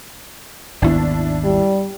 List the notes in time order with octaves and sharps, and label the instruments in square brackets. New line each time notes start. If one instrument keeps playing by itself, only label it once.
[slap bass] G#1 D#2 B3 [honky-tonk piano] D4 E4
[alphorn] G3